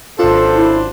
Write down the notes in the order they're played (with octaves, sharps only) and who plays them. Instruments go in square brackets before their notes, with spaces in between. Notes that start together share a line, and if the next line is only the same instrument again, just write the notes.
[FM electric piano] G#1 F4 [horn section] F#2 D4 C5 [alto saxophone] A4
[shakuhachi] E4